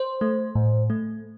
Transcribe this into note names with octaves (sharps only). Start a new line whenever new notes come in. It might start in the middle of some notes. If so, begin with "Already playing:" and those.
Already playing: C5
A3
A2
A3